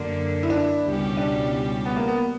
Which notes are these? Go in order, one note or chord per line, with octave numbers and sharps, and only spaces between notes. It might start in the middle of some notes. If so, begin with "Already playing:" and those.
Already playing: F#2 D3 A#3
E4
D4
C#2 B2 G3 C#4 G4
D4
B3
A#3
B3